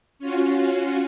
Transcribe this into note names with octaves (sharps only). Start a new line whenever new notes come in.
C#4 F4 F#4